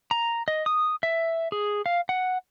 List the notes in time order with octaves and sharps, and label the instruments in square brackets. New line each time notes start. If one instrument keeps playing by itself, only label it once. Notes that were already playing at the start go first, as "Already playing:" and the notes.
[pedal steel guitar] A#5
D#5
D#6
E5
G#4
F5
F#5